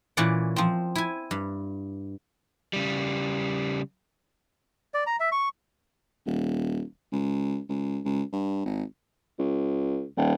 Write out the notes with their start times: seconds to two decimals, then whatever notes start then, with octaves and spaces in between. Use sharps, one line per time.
0.17 A#2 E3 C#4 D5 F#5
0.56 F3 C4
0.95 E4 G#5
1.31 G2
2.73 C#3 G3
4.94 D5
5.07 A#5
5.20 E5
5.32 C#6
6.26 D#1
7.12 C#2
7.69 C#2
8.05 C#2
8.33 G2
8.66 G#1
9.39 C#2
10.17 D#1